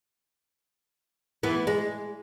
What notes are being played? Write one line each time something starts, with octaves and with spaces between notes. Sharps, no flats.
E3 B3
G#3